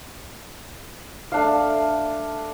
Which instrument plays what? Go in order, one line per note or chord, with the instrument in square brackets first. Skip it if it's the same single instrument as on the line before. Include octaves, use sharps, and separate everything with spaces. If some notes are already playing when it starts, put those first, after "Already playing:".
[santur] A3 D4 F5